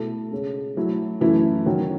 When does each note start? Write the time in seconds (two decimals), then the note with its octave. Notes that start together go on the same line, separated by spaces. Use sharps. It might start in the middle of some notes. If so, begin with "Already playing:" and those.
Already playing: B2 A3 E4 A4
0.32 C#3 G#3 C#4
0.77 F#3 A3 E4
1.21 F#2 E3 A3 E4
1.66 D#3 F#3 C#4 F#4 C#5